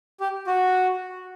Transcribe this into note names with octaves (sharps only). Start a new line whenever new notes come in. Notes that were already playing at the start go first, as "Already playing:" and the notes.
G4
F#4